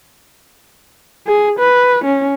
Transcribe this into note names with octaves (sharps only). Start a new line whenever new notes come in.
G#4
B4
C#4